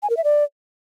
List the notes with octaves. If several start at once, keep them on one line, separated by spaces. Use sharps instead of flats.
G#5
A#4
E5
D5